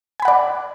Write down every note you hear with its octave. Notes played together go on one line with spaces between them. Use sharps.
D5 F#5 G#5 B5